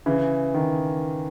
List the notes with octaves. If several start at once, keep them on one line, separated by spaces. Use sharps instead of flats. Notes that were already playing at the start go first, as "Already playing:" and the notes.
C#3 E3
D#3